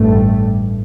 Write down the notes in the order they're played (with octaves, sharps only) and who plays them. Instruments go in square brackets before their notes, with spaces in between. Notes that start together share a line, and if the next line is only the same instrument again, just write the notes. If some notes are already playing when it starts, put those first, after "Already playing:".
Already playing: [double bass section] A1 G2 A3